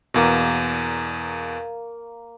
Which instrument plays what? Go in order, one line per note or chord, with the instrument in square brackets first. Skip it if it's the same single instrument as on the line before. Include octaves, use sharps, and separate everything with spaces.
[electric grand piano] E2 B2 [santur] A#3 C#6